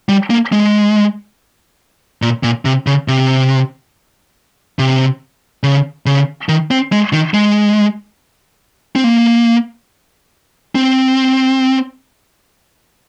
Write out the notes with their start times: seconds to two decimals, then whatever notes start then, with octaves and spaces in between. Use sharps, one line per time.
0.09 G3
0.30 A#3
0.52 G#3
2.22 A#2
2.43 A#2
2.65 C3
2.87 C#3
3.08 C3
4.79 C3
5.63 C#3
6.06 C#3
6.49 D#3
6.71 C4
6.92 G#3
7.13 D#3
7.34 G#3
8.96 C4
9.04 A#3
10.75 C4